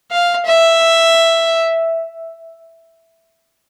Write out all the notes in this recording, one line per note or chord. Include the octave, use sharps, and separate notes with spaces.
F5
E5